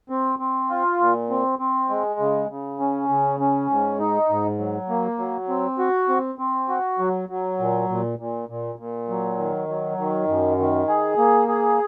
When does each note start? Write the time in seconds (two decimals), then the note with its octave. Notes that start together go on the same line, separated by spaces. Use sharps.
0.10 C4
0.39 C4
0.70 F4
1.00 A#2
1.30 C4
1.59 C4
1.90 G#3
2.20 C#3
2.49 C#3
2.80 C#4
3.09 C#3
3.40 C#4
3.70 G#2
3.99 D#4
4.30 G#2
4.59 F#3
4.89 A#3
5.18 F#3
5.49 C4
5.78 F#4
6.09 C4
6.39 C4
6.69 F#4
6.99 F#3
7.29 F#3
7.59 A#2
7.89 A#2
8.19 A#2
8.49 A#2
8.79 A#2
9.09 F#3
9.38 D#3
9.68 F#3
9.98 D#3
10.28 F#2
10.58 D#3
10.88 G#4
11.18 A#3
11.48 G#4